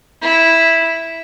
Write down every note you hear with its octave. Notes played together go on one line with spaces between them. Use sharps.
E4